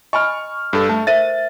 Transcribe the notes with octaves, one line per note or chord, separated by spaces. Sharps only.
D#5 G#5 B5 C#6 F6
G2 A4
A3 A5
A#4 C5 E5 A6 D#7